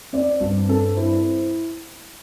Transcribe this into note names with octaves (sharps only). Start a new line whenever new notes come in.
C4 D5
G2
C4 A4
E4 C5